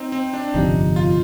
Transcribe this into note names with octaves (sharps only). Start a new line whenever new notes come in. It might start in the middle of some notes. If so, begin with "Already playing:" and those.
Already playing: C4 D#4
C4
D4
G1 F2 C3 D#4
F4